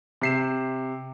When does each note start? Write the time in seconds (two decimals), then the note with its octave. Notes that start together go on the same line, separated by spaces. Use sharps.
0.21 C3 C7 E7